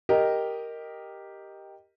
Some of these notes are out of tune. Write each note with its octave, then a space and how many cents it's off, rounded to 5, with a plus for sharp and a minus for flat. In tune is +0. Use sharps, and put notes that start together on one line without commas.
G4 +0 A#4 +0 D#5 +0